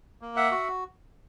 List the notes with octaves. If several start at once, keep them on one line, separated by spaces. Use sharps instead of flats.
A#3
E5 F#5
F#4